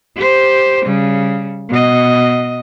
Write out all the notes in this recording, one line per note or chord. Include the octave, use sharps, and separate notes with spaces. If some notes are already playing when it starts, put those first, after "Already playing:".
G4 C5
C#3 G3
B2 D#5